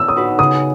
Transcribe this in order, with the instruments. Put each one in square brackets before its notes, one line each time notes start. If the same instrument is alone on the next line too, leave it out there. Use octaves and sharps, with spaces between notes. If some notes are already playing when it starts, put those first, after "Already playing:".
Already playing: [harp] B3 [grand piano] E6
[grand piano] D#6
[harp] D#4 F#4 B4
[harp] C#3 [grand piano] D#6